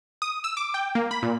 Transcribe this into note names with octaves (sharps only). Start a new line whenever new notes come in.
D#6
E6
D6
G5
A#3
B5
A#2